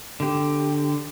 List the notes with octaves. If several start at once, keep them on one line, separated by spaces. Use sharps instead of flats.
D3 G4